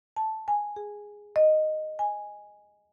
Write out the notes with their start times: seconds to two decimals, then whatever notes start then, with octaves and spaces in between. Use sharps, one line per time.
0.17 A5
0.48 G#5
0.76 G#4
1.36 D#5
1.99 G#5